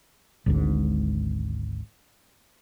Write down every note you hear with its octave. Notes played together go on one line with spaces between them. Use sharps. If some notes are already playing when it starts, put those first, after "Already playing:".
G#1 D2 G#2